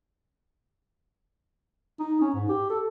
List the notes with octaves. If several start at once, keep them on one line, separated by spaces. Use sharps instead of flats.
D#4
C#4
G#2
G4
A4